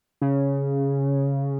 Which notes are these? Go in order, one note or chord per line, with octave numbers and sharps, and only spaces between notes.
C#3